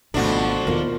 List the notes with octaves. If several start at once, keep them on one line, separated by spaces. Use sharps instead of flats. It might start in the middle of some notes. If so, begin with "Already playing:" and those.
G#1 F2 B2 F3 A3 D4 F#4
D#2 B2 F4 A#4